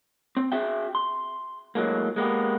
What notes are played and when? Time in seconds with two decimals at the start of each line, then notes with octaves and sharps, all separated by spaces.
0.37 C4
0.52 F#4 G#4 E5 G5
0.95 C6
1.75 A2 F#3 G#3 A#3
2.16 G#3 A#3 B3 G4